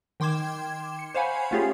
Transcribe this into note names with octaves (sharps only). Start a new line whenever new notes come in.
D#3 G5 C6 D6 G#6 E7
C#7
C5 C#5 F5 F#5 G#5 B5
A3 C#4 F4 G4 G#4 C#5